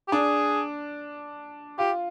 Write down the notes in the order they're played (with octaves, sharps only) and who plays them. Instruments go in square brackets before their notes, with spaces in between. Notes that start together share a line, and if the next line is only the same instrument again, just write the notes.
[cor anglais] G4
[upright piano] D4 [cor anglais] G#4
[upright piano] F4 [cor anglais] G4